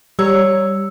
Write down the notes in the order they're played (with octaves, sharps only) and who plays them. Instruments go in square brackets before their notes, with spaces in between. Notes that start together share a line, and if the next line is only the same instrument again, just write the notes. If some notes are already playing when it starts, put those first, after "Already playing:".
[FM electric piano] G3 [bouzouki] C#5 A#5 [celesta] E6